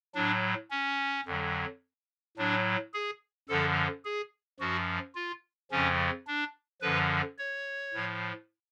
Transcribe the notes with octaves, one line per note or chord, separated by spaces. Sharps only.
A2 F#3 D4
C#4
F2 D3 F#3
A2 F#3 D4
G#4
F#2 D3 F3 A4
G#4
F#2 F3 F#4
F4
F2 C#3 F3 C#4
D4
F#2 D3 F3 B4
C#5
A2 F3